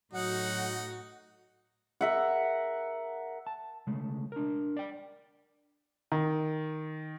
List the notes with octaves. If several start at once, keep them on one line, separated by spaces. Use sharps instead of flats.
A2 F#3 D#4 F#4 F#5
A#4 E5 F#5
A5
C#3 G#3 A3
D4 A#4
D5 G5
D#3